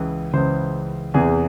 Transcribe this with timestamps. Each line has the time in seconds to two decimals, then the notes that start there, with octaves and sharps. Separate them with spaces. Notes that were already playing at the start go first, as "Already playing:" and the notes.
Already playing: C#2 C#3 E3
0.34 C#2 C#3 E3 C5
1.14 E2 C3 E3 G#4